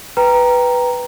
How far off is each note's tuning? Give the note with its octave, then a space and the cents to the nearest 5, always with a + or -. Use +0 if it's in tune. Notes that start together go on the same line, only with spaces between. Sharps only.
B4 +0 G5 +0 A#5 +0